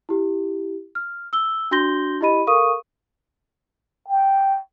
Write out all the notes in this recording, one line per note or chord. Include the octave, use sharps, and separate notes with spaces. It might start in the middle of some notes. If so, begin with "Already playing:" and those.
E4 G4
F6
E6 G7
D4 F#4 C6 G6 A#6 G7
E4 G4 D#5 B5 D#7
A4 A#4 F5 C#6 D#6 D#7
G5